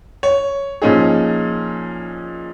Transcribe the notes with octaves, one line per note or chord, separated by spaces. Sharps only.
C#5
A#2 F3 C#4 D#4 G#4